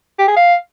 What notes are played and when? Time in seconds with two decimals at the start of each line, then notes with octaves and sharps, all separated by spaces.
0.19 G4
0.28 G#4
0.36 F5